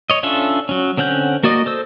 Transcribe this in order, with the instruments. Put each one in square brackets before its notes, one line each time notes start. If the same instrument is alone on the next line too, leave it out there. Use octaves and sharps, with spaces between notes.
[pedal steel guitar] C#5 D#5
C#4 D4 F4 A4 E5
F#3 C#4
D3 C4 C#4 F#5 G6
A#3 F#4 D5 D#5
A4 C5 E6